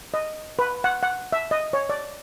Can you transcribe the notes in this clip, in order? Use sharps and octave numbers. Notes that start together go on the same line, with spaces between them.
D#5
B4
F#5
F#5
E5
D#5
C#5
D5